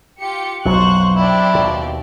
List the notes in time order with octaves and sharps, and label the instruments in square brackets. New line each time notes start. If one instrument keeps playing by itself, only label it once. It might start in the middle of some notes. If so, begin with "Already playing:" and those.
[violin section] F4 G4 C#7
[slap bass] B1 F2 [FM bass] F#3 [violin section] C5 C#6 F#6
[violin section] C4 G4 D5 [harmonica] D4 E4
[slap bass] D#2 B2